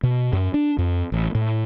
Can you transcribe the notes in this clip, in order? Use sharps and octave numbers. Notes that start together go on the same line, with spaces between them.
B2
F#2
D4
F2
A1
A2